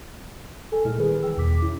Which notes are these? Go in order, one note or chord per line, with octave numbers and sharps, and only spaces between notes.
A4 G#5
A#2 G#3 E4 F6
D#3 G3 G#3 G#4 B4
E3 G5 E6
E2 B2 D6 B6
C#4 E4